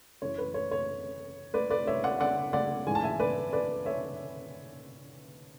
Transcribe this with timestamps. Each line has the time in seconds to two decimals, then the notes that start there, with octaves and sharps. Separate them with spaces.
0.22 F#2 E3 C#5
0.38 B4
0.54 C#5
0.71 C#5
1.54 B4 D5
1.70 B4 D5
1.87 C#5 E5
2.04 D5 F#5
2.20 D5 F#5
2.53 D5 F#5
2.87 G#2 E3 G#5
2.95 A5
3.03 E5 G#5
3.19 B4 D5
3.53 B4 D5
3.86 C#5 E5